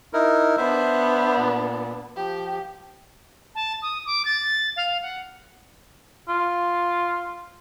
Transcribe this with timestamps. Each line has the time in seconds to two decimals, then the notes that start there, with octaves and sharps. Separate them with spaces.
0.13 D#4 E4 A#4
0.57 B3 D4 C5 E5
1.37 A#2
2.16 F3 G4
3.55 A5
3.82 D#6
4.05 D6
4.25 A6
4.76 F5
5.02 F#5
6.29 F4